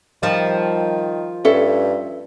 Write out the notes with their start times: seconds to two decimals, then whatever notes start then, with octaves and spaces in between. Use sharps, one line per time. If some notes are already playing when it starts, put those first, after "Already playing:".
0.23 D#3 F3 G3
1.45 G2 C#4 A4 E5